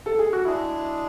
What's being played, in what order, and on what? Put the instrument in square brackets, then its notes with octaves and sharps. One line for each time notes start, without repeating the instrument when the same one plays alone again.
[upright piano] A4
G#4
F#4
[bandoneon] G#3 D4 G#4 [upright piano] E4